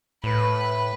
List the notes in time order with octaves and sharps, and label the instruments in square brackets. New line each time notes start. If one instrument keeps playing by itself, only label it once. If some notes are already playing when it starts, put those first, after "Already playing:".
[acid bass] A2 [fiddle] B4